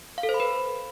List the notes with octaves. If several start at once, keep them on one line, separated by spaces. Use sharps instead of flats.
F5
A4
C5
B5
B4